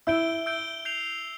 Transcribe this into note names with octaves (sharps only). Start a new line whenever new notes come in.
E4 E6 G6 D7 G7
E6 G6 D7 G7
G6 C7 F7